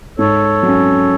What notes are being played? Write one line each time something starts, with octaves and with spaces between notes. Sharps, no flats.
G#2 A4 C#5
F#3 C#4